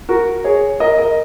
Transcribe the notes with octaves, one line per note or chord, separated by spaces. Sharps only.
F#4 A#4
G#4 C#5
A#4 D#5
A#4 D#5